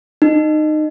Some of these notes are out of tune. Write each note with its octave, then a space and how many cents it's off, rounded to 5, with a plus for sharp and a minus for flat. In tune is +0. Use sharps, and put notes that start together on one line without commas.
D#4 -20